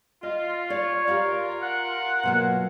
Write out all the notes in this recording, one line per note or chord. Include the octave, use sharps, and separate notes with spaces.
F4 D#5
C#5 D5
F4 G4 A#4 D5 F5
F#5
B2 F#3 A#3